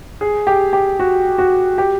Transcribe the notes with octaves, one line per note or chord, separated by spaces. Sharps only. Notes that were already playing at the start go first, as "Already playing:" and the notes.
G#4
G4
G4
F#4
F#4
G4